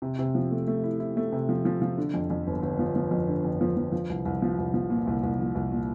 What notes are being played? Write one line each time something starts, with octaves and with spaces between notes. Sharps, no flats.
C3
C3
F3
A3
A3
E4
E4
A3
C3
F3
F3
F3
D3
F2
F2
G1
G1
F3
F3
F2
D3
F2
F3
F3
F3
C2
C2
F3
C2
F3
A#2
C2
C2
F3
C2
A#2